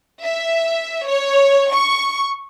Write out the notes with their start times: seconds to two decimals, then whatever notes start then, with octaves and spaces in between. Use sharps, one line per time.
0.23 E5
1.08 C#5
1.72 C#6